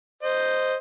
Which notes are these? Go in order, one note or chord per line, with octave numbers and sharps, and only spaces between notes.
C5 D#5